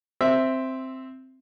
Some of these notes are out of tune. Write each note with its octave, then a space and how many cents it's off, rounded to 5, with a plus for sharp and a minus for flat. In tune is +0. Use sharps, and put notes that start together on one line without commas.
C4 +0 E5 +0